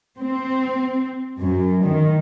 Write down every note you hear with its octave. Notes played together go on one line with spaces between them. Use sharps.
C4
F#2
D#3